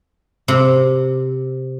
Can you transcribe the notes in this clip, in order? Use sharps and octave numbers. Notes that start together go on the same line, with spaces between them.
C3